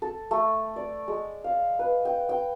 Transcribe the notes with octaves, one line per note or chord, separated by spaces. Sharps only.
A4
A3
D5
G#3
F5
B4
G5
G5